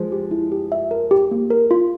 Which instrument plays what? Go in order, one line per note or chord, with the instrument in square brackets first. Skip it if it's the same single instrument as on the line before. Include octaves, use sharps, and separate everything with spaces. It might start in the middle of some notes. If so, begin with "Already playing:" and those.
Already playing: [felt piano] F3 G#3 [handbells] C5
[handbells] G4
E4
G4
E5
A#4
G4
A#3
A#4
F4